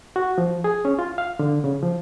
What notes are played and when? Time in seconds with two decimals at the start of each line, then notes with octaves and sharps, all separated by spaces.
0.16 F#4
0.38 F3
0.64 G#4
0.85 C#4
0.99 F4
1.18 F5
1.39 D3
1.64 C#3
1.83 F3